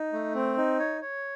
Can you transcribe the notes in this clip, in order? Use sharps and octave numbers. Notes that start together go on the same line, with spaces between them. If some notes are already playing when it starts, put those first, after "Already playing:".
Already playing: D#4
A3
C4
D#4
C#5
C#5